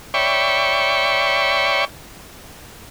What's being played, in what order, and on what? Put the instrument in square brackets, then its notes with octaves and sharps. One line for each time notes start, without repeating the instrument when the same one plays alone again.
[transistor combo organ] C#5 D5 E5 G5 B5 C#6